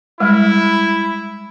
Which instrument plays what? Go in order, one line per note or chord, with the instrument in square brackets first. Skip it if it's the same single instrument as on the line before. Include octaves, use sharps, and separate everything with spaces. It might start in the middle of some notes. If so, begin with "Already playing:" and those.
[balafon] G3 G#3 [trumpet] E4